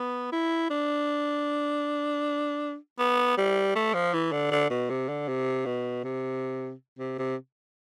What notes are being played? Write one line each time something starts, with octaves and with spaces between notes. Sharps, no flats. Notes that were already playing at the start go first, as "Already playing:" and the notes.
Already playing: B3
E4
D4
B3
G3
A3
F3
E3
D3
D3
B2
C3
D3
C3
B2
C3
C3
C3